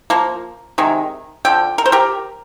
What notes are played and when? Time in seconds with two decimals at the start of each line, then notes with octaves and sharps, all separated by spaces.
0.10 F3 A#3
0.78 C3 D#3 G#3
1.45 D3 F3 G5
1.78 A#4
1.86 C5
1.92 G4 A#4